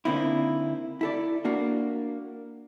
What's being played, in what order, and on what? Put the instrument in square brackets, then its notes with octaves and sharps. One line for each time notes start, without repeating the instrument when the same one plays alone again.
[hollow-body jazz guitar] D3 A#3 C4 D#4 E4
E4 A4 D5
A#3 D4 F#4